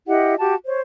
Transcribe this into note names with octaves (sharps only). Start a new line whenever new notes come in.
E4 G4 D#5 F#5
F#4 G4 A5
C5 C#5